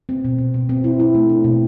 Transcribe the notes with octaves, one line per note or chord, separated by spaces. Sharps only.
C4
B2
B2
B2
C4
E4
E4
A3
D4
B2